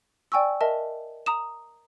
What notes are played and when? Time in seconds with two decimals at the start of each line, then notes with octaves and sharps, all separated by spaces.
0.32 D5 G5 G#5 C#6 E6
0.61 A#4 D#5 E5 A5
1.26 A#5 D#6 E7